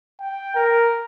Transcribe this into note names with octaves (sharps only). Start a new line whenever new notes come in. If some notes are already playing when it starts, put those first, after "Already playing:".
G5
A#4